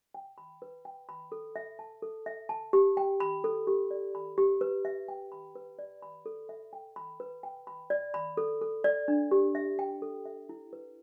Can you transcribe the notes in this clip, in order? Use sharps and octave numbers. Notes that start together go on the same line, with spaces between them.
G5
B5
B4
G5
B5
A4
E5
A5
A4
E5
A5
G4
G5
B5
A4
G4
D5
B5
G4
B4
E5
G5
B5
B4
D5
B5
A4
E5
G5
B5
B4
G5
B5
D5
B5
A4
A4
D5
D4
G4
E5
G5
A4
E5
E4
B4